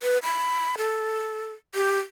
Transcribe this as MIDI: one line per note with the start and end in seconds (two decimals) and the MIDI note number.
0.03 0.18 71
0.23 0.76 83
0.78 1.52 69
1.75 1.97 67